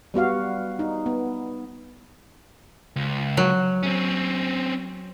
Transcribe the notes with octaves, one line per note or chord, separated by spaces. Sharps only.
G3 B3 F#4 F5
D#4
B3
C#2
F#3
C4 C#4